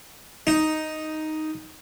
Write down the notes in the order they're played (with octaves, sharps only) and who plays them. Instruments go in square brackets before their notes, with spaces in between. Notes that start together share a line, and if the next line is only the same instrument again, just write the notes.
[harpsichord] D#4